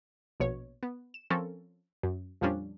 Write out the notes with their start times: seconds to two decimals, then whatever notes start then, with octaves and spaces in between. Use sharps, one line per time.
0.40 A#1 B2 C#5
0.83 B3
1.14 E7
1.30 F3 C4 C#4 A4 A#4
2.03 F#2
2.41 F2 A#2 F3 G3 C#4 D4